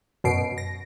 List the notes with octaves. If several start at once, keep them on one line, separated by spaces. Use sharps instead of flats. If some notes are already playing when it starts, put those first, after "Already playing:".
F#2 B2 C7 D7
A#6